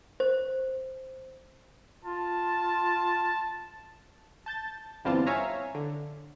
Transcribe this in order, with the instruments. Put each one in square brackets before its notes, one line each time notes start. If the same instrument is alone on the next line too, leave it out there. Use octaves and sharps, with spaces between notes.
[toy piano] C5
[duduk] F4 [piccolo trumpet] A5
[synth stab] A5 G6 A6
G1 E3 G3 C4 F4 A5
C#5 E5 F5 G#5 A#5
D3